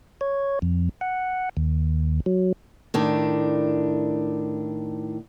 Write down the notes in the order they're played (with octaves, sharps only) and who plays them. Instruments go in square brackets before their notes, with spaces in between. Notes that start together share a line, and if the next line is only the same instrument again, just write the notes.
[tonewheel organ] C#5
F2
F#5
D#2
F#3
[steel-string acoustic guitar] A2 D#3 D4